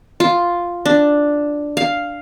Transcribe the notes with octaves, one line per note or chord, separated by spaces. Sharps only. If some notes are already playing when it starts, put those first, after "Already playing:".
F4
D4
F5